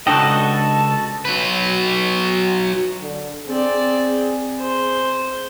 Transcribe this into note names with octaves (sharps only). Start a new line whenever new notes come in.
C#2 D4 F#4 A4 D#5 G5 A5
F#3 B4
D3
C4 G#4 D5
C5